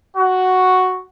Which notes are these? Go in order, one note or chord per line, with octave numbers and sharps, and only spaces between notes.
F#4